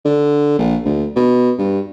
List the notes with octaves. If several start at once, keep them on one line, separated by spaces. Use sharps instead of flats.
D3
A#1
D2
B2
G2